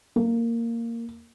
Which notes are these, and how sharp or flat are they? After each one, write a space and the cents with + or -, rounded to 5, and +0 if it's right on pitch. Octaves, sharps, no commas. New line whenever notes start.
A#3 -10